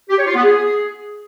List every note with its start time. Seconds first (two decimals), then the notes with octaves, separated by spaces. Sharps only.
0.10 G4
0.18 C#5
0.27 F4
0.35 B3
0.44 G#4